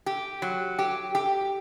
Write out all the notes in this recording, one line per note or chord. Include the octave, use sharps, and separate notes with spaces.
G4
F#3
G4
G4